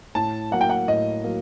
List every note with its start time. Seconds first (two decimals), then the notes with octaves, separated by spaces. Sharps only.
0.15 A2 A5
0.51 F#3 A#3 F#5
0.61 G5
0.69 F#5
0.88 A2 D#5
1.24 F#3 A#3